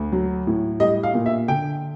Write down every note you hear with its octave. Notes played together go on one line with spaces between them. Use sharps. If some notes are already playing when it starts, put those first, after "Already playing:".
Already playing: D2
F#3
A2
G3 D#5
F5
A#2
E5
D3 G5